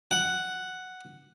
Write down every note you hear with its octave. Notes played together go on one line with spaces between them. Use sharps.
F#5